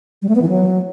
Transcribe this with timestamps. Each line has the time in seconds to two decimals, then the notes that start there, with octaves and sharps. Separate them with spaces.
0.22 G3
0.29 A3
0.35 B3
0.42 E3
0.49 F#3